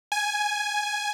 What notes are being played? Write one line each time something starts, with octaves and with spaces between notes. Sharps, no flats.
G#5